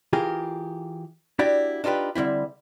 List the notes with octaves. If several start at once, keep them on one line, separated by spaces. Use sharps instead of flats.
E3 F4 G4 G#4 A#4
D4 E4 F#4 G4 D5
D4 D#4 F4 G4 B4
D3 G3 C4 E4